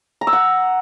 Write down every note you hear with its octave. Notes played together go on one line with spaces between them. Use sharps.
A#5
E6
F#5